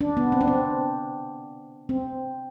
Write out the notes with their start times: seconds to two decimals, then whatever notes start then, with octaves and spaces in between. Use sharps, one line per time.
0.01 D4
0.17 B3
0.32 C4
0.41 D4
0.48 C4
1.89 C4